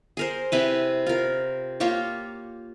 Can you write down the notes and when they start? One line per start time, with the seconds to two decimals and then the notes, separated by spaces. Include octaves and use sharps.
0.17 G#4 A#4 C5
0.52 C3 E4 B4
1.06 F4 A#4
1.80 A#3 F4 G4 C#5